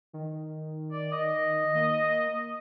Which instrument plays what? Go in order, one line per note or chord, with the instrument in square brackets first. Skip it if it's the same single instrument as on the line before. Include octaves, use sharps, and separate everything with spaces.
[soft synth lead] D#3
[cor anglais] D5
D#5
[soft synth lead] A#3